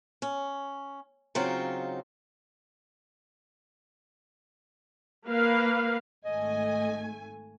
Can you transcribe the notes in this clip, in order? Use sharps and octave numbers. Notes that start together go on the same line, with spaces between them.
C#4
C#3 F#3 C4 D#4 F4
A#3 B4 F5
G#1 A3 D#5 G#5